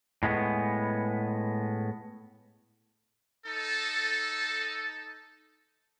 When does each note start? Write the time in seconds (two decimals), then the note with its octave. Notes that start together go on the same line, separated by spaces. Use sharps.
0.23 A2 G#3 B3
3.45 D#4 A4